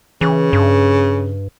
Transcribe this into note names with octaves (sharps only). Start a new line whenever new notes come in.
C#3 E3
G2